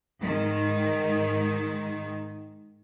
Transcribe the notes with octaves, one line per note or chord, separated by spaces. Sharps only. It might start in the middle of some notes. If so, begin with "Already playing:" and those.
G#2 D#3